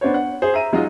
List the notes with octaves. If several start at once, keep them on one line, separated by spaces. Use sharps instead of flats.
B3 D4 C5 C#5
F#5
G#4 C5
E5 A#5 D#7
F#3 G#3 D#4 F4 D#5